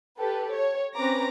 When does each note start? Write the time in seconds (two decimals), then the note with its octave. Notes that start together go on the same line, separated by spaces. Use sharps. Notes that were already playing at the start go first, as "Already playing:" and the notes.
0.19 G4 A4 B4
0.54 C#5
0.95 C4 C#4 B4 A#5 D6 A#6